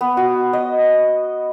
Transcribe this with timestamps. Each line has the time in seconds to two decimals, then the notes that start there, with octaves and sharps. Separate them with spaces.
0.01 B3
0.17 F#4
0.53 D#5